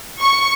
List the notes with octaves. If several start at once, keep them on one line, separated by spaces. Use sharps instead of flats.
C#6